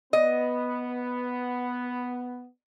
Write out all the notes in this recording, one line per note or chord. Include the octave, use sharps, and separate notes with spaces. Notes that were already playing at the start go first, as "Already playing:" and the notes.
B3 D#5